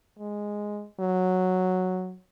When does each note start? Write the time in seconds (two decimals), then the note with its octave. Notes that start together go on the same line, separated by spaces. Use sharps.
0.19 G#3
1.00 F#3